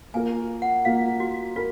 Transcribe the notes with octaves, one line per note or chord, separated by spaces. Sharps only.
A#3 F4 A#4 G#5
F#5
A#3 F4 A#4 F5
F#4
F4 A#4